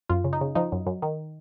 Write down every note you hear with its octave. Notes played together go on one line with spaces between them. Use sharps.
F#2 F4
C#3
D#4
C#3
F3 D#4
F#2
F#2
D#3